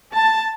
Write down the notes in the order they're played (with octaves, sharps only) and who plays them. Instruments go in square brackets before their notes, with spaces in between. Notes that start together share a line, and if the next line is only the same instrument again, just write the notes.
[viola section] A5